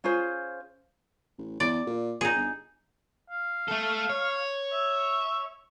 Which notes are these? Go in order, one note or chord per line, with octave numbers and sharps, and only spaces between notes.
C#4 F4 G#4 C5
A1
E2 D5
A#2
A#2 D#4 G#4
G1
F5
A3 A4
C#5
E5